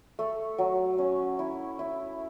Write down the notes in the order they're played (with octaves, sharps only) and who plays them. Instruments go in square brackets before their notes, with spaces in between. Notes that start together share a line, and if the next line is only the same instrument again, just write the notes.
[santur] A3
F#3
C#4
E4
E4